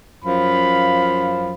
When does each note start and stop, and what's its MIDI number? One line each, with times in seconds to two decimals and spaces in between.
0.24 1.54 42
0.24 1.54 53
0.24 1.54 77
0.24 1.54 83